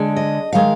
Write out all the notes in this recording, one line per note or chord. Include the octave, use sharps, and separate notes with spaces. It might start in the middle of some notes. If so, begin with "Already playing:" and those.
Already playing: D3 G#3 D4
D#5
D#3 G#3 F5